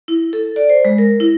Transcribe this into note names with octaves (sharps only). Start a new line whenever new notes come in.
E4
A4
D5
C5
G#3
A#4
E4